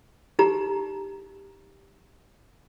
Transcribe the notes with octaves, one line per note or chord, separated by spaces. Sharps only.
D#4 G4 A#5